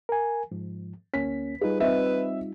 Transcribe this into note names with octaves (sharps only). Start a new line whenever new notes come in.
A#4 G#5
G#2 F3
D2 A#3 C#4 B6
G3 D#4 F4 G#4 B4
C4 B4 D#5 E5